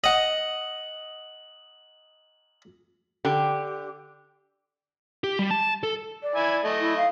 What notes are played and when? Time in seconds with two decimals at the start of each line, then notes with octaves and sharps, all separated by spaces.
0.04 D#5 F#5 F#7
3.25 D3 G4
5.24 G4
5.39 G3
5.51 A5
5.83 A4
6.22 D5
6.35 E4 E5 G#5
6.64 A3 D#5
6.80 E4
6.96 F5